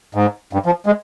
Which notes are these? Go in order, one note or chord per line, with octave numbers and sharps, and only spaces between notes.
G#2
G2
F3
G#3